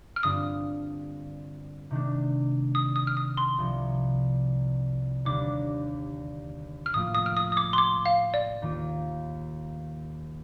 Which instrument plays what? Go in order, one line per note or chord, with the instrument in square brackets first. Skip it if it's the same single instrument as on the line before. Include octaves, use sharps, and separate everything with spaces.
[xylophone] F6
[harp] G2 D3 G3 C4 F4 [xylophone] D#6
[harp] C3 D#3 A3 D4
[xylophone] D#6
D#6
F6
D#6
C6
[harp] C2 C3 F3
[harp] D#2 D3 G3 D4 [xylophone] D6
[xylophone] F6
[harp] A2 F3 A#3 F4 [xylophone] D#6
[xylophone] D#6
F6
D#6
D#6
D6
C6
D6
F5
D5
[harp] D#2 D#3 A#3 F4